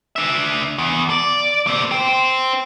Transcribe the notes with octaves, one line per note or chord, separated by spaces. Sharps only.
D4 E5
E2
D5
A#3 C4
C5 G5